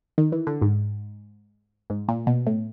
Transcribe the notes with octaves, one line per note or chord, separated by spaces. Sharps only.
D#3
E3
D3
G#2
G#2
A#2
B2
A2